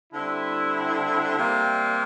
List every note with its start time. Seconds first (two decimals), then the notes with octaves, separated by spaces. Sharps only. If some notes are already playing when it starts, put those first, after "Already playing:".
0.13 D3 G3 C4 E4
1.36 C3 G3 A#3